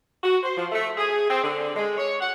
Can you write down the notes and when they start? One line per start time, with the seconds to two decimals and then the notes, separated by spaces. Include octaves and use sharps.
0.23 F#4
0.43 C5
0.57 F3
0.72 A3
0.98 G#4
1.29 C4
1.44 D3
1.75 G#3
1.97 C#5
2.21 F#5